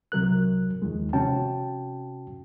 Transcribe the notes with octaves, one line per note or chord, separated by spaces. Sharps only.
C2 C3 F#3 A#4 F#6
D#2 D#3 F3 G#3
C3 C#4 F#4 G5 A5